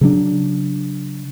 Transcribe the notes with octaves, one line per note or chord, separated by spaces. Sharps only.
C#3 F#3 D4